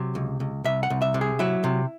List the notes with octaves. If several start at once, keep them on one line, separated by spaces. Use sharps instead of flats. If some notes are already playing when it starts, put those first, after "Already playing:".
Already playing: C3 F#3
C#2
C#2
C2 E5
F#5
C2
E5
C3
G#4
F#3 E4
C3